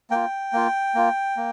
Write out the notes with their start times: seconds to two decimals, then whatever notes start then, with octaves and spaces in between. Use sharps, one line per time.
0.11 A#3 F4 G5
0.53 A#3 F4
0.95 A#3 F4
1.37 A#3